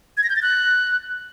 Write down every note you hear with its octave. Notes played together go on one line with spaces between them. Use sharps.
G#6
A#6
G6
A6
F#6